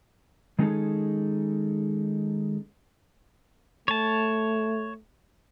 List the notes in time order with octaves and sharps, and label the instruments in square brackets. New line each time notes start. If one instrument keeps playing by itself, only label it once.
[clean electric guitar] D#3 G#3 C#4 D#4 G#4 A4
[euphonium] A3 [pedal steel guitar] C#5 A5